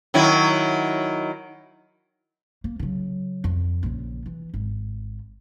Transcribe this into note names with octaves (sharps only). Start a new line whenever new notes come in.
D#3 F#3 E4
A#3
C#3 F#3
F2
A#1 C#3
E3
G#1